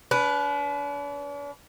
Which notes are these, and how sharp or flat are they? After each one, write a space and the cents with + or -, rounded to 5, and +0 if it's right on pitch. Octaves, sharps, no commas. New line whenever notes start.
D4 -45 B4 +0